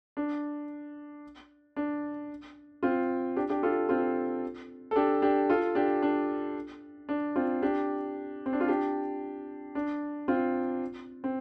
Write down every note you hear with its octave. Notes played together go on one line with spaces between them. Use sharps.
D4
D4
C4 F4
D4 G4
D4 G4
F4 A4
C4 F4
A4
D4 G4
D4 G4
F4 A4
D4 G4
D4
D4
C4 F4
D4 G4
C4
D4
F4
D4 G4
D4
C4 F4
C4